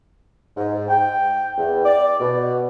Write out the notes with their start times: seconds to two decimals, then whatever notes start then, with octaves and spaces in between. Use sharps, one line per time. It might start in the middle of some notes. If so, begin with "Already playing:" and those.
0.57 G#2
0.88 G5
1.57 E2
1.85 D5
2.20 B2